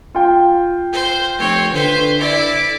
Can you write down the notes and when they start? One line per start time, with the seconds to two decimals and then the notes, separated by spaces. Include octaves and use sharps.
0.15 F4 G5
0.93 C5
1.38 F1 C4 C#5
1.73 D3 B4 C5
2.18 E4 D5